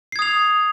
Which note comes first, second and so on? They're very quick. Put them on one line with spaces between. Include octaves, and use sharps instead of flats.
C7 G#6 D#6 F7